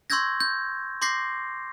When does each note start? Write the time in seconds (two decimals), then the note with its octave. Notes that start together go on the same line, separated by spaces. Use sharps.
0.10 C6 C#6 E6 G6 G#6 A#6
0.40 G6
1.02 C6 D6 G6 A#6 C7